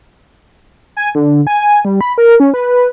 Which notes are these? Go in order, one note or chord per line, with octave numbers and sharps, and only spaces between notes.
G#5
D3
G#5
G3
B5
A#4
C#4
B4